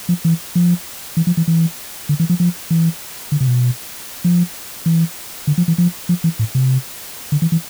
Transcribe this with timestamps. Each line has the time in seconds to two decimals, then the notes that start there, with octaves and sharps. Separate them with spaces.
0.09 F3
0.25 E3
0.55 F3
1.17 E3
1.27 F3
1.37 E3
1.48 E3
2.09 D3
2.20 E3
2.29 F3
2.40 F3
2.71 E3
3.32 D3
3.40 C3
3.48 B2
4.24 F3
4.86 E3
5.47 D3
5.58 F3
5.68 E3
5.78 F3
6.09 F3
6.24 E3
6.39 A2
6.55 C3
7.32 D3
7.42 E3
7.52 E3